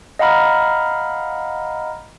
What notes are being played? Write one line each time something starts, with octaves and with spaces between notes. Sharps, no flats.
D#5 F5 F#5 A#5 B5 F6